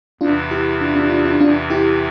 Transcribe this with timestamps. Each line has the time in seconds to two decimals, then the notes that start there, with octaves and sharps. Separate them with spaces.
0.21 E2 C3 E3 D4 F4
0.51 E4 G4
0.81 D4 F4
0.96 D4 F4
1.10 D4 F4
1.25 D4 F4
1.40 E2 C3 E3 D4 F4
1.70 E4 G4